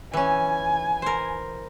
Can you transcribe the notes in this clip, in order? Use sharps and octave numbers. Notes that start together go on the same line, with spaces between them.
E3 C#4 G#5
A#4 C5